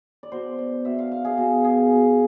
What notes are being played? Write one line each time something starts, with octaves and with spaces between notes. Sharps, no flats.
D5
B2 C5
D5
B2 E5
F5
F5
G#4
B2
G#4
B2